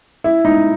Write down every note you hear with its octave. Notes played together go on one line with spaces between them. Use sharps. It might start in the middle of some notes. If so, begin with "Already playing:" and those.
E4
D#4